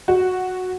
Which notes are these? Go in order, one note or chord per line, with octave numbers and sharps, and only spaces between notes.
F#4